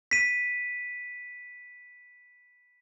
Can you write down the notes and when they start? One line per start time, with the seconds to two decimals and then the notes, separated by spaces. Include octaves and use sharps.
0.11 B6 D#7